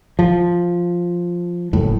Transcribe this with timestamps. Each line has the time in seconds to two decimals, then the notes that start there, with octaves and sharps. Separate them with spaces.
0.19 F3
1.73 F#1 A2